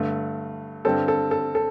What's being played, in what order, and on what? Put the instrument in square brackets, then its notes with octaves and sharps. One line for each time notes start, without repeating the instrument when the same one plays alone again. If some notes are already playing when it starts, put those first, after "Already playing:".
Already playing: [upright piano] G2 D3 A3
G2 D3 G3 C4 A4
A4
A4
A4